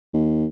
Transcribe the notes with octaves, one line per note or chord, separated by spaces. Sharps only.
D#2